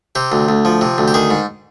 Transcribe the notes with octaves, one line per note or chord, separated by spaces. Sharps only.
C3 G4
D2
D2
F3
C3
D2
G4
D#3 G#4
G#2